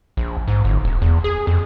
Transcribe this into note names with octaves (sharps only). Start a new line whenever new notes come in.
A#1
G#2
G1
D#1
E2
G#4
F2